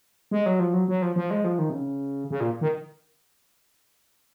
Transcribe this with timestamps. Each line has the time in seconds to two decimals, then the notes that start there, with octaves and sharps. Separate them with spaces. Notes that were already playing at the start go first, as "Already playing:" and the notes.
0.31 G#3
0.46 F#3
0.59 F3
0.74 F#3
0.88 F#3
1.02 F3
1.16 F3
1.31 G#3
1.44 F3
1.59 D#3
1.69 C3
1.73 C#3
2.31 C#3
2.40 A#2
2.61 D#3